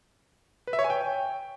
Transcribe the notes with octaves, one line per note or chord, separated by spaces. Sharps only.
B4
E5
C#5
G#5
G5